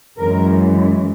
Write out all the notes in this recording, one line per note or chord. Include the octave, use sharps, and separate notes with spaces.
F#2 E3 G#3 A#4